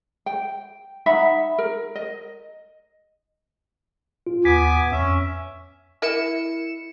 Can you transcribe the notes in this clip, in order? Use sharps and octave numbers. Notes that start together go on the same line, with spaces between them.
G5
D#4 E5 F#5 B5
A#4
D#5
F4
D#2 B3 G#5 D6 B6
F2 C#4 E5
E4 A#4 D#5 E5 C#7 E7